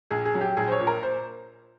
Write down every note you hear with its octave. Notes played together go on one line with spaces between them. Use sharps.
A#1 G#4
G#4
F#3
G4
A#1 G#4
C5
C#5
A#2
A#4
C5